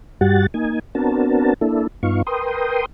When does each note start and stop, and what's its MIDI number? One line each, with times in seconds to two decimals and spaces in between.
0.21 0.47 43
0.21 0.47 55
0.21 0.47 66
0.21 0.47 67
0.21 0.47 78
0.21 0.47 93
0.54 0.79 58
0.54 0.79 63
0.54 0.79 80
0.95 1.54 59
0.95 1.54 60
0.95 1.54 62
0.95 1.54 66
0.95 1.54 70
0.95 1.54 81
1.61 1.87 58
1.61 1.87 62
1.61 1.87 64
1.61 1.87 69
2.03 2.22 43
2.03 2.22 59
2.03 2.22 63
2.03 2.22 65
2.03 2.22 77
2.03 2.22 85
2.27 2.86 70
2.27 2.86 71
2.27 2.86 79
2.27 2.86 84
2.27 2.86 87